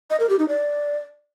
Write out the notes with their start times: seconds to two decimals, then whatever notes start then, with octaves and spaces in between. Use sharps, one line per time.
0.10 D#5
0.20 A#4
0.29 G4
0.39 D#4
0.49 D5